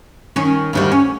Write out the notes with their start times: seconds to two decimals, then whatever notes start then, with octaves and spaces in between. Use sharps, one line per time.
0.36 D#3 C#4
0.73 D2 D#3 G3
0.92 C#4